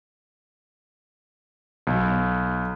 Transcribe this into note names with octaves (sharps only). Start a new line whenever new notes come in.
B1